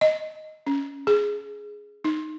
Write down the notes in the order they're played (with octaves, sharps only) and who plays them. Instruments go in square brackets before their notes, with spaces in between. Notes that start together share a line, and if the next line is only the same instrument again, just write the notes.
[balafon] D#5
C#4
G#4
D#4